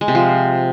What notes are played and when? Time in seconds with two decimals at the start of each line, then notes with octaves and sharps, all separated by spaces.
0.01 G#3
0.08 C3
0.15 F3